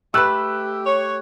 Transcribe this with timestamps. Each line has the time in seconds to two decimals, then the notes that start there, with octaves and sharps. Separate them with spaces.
0.14 A3 G4 B4 E6 F#6
0.86 C#5